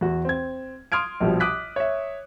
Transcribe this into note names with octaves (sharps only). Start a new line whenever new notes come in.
E2 F#4
C4 G#6
C6 D#6 F6 G#6 D7
A#1 B2 F3 G3
D6 D#6 F#6 B6
C#5 E5